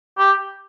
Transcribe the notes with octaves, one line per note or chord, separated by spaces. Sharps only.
G4